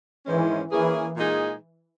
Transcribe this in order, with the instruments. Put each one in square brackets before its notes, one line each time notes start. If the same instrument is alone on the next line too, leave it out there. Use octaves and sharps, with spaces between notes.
[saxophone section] G#2 D#3 G#3 C#4 [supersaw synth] E3
[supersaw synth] E3 [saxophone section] A#3 C#4 G#4
[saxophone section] A#2 G#3 D#4 G#4